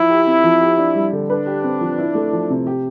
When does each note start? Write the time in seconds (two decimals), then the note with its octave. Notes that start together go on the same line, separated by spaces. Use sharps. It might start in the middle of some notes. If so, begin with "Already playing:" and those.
Already playing: F3 E4
0.10 G4
0.27 C4
0.44 F3
0.61 G4
0.78 D4
0.95 G3
1.13 D3
1.30 D4 B4
1.46 G4
1.64 C4
1.81 F3
1.98 E4
2.15 A3
2.33 F3
2.50 C3
2.67 G4